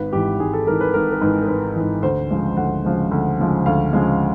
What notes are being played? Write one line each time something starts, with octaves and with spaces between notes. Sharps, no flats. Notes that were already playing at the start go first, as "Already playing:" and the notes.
Already playing: G#1 B4
G#2 E3 G4
G#1 G#4
A4
G#2 E3 A#4
B4
G#1 A#4
A#4
G#2 E3 B4
A#4
G#1 B4
G#2 E3
D2 C5
C#3 F3 G#3
D2 F#5
C#3 F3 G#3
D2
C#3 F3 G#3
D2 F5
C#3 F3 G#3